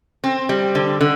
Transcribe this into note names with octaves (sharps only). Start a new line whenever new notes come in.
C4
G3
D3
D3